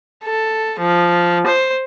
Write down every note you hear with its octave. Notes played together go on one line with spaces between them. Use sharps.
A4
F3
C5